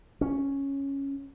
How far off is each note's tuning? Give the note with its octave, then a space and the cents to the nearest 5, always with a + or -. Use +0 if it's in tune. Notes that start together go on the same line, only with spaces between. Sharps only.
C#4 -5